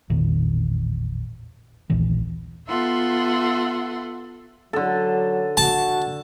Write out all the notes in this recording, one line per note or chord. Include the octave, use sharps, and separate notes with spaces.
A1 E2 A#2 D#3
A#1 D#2 A#2 E3
B3 F4 A4 E5 F#5 C6
D3 F#3 A4
F#4 A5